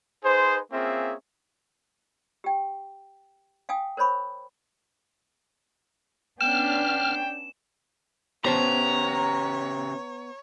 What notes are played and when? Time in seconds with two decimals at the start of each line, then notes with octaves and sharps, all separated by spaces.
0.24 D#4 G#4 B4 C5
0.72 A#3 C4 C#4 F4 G#4 E5
2.44 G4 G5
3.69 F5 G5 G#5 D#6
3.97 A#4 C5 C#5 B5 C#6
6.41 B3 C#4 D4 G5 F6 E7
8.45 C#3 B3 G4 C5 C#5 A5 A#5